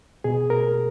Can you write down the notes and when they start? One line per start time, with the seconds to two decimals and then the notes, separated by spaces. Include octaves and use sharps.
0.24 B2 G#4
0.50 A#4